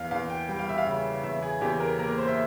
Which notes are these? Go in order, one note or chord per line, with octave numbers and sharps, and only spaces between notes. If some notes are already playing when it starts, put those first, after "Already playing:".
Already playing: E2 F5
E2 F5
G5
G3 G5
F5
E5
F5
C#3
E2 E5
G#4
E2 G4
A#4
A#3 A#4
C5
E5